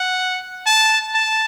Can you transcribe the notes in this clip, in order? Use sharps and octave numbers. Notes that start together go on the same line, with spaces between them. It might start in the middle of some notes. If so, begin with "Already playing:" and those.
Already playing: F#5
A5
A5